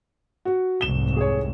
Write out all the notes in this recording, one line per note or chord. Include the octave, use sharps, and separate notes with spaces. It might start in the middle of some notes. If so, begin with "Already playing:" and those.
F#4
F1 C2 G#2 E7 G7
G#4 C#5